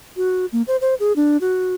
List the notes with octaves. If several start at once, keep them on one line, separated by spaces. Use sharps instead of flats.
F#4
A#3
C5
C5
G#4
D4
F#4